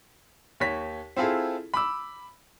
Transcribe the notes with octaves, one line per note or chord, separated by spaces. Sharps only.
D#2 C#5 B6
C4 E4 F4 G#4 A4
B5 D6 E6